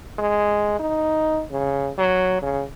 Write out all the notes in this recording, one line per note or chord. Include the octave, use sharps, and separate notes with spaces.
G#3
D#4
C#3
F#3
C#3